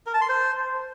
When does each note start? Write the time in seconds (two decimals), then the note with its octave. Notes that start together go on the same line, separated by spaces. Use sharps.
0.06 A#4
0.14 A5
0.21 C6
0.29 C5